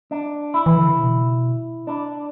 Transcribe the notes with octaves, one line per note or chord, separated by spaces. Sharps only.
D4
E4
E3
D3
C#3
B2
D4